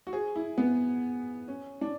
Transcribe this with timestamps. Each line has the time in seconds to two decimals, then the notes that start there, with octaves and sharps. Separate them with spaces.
0.07 F#4
0.13 G#4
0.36 E4
0.58 B3
1.48 C#4
1.81 D4